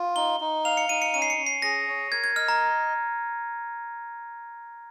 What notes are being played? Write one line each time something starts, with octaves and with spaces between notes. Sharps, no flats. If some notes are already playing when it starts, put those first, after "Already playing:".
Already playing: F4
D#4 G7
D#4
F5 F7
C#7
D#4 D#7
C#7
C#4 D#7
C7
C#7
C#4
C7
G#4 A#6
C#5
A#4 G#6
G#6
D#5 F6
A#5